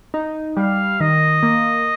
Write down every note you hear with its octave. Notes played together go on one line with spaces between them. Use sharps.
D#4
G3 F5
D#3 D#5
A#3